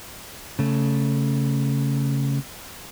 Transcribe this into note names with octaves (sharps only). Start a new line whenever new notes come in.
C#3 A3